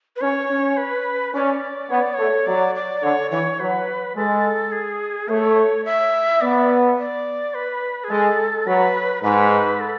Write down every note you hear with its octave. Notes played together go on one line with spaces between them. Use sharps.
B4
C#4 C#5
C#4
B4
C#4 D5
B3 C#5
D5
A3 C#5
F#3 D5
D5
D3 C#5
E3 C#5
F#3 B4
G#3 A4
G#4
A3 C#5
E5
B3 D5
D5
B4
G#4
G#3 A4
F#3 B4
G#2 B4
A4